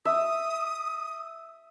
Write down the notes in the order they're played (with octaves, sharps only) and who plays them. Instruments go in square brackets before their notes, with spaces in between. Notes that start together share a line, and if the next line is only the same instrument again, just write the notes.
[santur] E5 [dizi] D#6